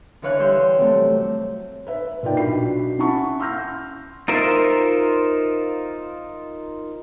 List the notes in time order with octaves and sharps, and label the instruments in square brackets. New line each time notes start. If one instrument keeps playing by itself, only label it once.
[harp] D3 E3 B4 C#5 F5 F#6
G3 C#5 C6 E6 G6
C3 F#3 A3
[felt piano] B4 E5
A#2 D#4 F4 D5 G5
B1 D4 F#4 B5 C7
C#4 E4 F#5 A5 B5 C#6
C6 E6 F6 G6 A#6
[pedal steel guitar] D#4 F4 A#4 C5 E5